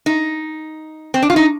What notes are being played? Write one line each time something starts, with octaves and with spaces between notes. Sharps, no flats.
D#4
C4
D4
F4
D#4